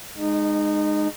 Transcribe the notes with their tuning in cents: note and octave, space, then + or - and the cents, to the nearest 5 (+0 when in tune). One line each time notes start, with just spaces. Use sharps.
G#3 +0 D#4 -25